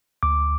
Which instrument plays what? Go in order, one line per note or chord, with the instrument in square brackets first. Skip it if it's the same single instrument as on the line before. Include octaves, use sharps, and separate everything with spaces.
[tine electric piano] D2 D6